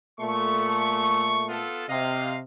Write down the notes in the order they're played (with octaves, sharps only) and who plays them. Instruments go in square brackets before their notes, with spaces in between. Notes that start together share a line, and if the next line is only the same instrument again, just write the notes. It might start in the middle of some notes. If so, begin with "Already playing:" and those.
[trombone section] A#2 A3 [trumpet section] C#6
[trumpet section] B3 F4 A4
[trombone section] C3 [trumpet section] D#5 F5